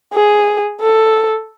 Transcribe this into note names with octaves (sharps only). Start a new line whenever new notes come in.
G#4
A4